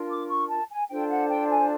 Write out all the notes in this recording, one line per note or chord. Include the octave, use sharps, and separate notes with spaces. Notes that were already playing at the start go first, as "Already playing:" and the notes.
Already playing: D4 F4 A#4
D6
C#6
A5
G#5
D4 F4 A4 C5 G5
F#5
G5
G#5